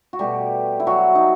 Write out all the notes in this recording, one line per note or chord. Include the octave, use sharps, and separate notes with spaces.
F#4
B2 G3 A3 G4
E4
F#3 F#4
D#4